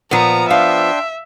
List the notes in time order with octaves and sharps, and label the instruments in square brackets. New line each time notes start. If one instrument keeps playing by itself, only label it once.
[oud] A#2 [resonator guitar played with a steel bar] F3 B3 [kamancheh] A#5
[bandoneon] D4 G5 C6 [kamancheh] E5 [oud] F5